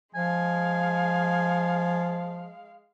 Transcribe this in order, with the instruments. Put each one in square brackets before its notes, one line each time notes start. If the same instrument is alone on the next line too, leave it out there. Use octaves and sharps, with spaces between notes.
[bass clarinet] F3 [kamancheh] G#3 F5 [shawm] G#5